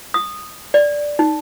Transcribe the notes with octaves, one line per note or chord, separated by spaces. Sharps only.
D#6
D5
D#4